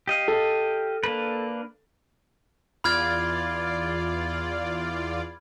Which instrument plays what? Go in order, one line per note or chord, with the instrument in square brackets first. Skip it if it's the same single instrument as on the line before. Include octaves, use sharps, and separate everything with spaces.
[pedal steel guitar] G4 D#5 F5
[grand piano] A4
[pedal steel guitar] A#3 D4 B4
[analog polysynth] E2 F4 D5 [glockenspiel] B5 F6 G#6